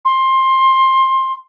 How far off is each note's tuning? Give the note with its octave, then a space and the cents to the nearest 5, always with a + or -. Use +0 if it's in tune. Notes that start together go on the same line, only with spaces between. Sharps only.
C6 +20